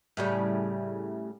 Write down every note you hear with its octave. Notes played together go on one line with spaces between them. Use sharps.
A2 C#3 G3